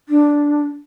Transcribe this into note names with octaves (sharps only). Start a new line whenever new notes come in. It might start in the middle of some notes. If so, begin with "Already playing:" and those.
D4